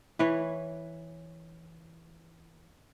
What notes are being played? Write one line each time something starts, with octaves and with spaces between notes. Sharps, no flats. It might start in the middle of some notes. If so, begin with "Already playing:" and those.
E3 B4 C#5